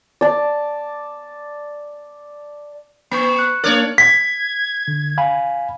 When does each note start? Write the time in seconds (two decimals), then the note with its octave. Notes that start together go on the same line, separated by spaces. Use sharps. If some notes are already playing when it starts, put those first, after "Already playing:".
0.21 D5 A5
3.11 A#3 B5 C#6
3.36 F#6 C#7
3.64 A#3 D4 A#4 C#5 D5
3.98 G#6 B6
4.88 D3
5.18 F5 G#5 B5